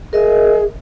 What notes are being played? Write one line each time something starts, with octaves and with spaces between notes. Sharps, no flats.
G#4 A#4 D#5 E5